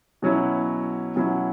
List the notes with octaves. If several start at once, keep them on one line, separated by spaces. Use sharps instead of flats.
B2 F#3 C#4 E4
B2 F#3 C#4 E4